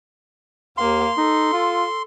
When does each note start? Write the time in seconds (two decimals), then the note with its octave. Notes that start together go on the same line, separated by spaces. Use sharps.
0.78 D#2 A#3 F5 C6
1.17 D#4 A4
1.53 F4